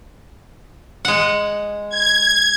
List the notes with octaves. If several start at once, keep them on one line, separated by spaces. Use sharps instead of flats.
G#3 F#5
G#6